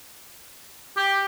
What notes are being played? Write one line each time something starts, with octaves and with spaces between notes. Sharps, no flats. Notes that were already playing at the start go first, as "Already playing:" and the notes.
G4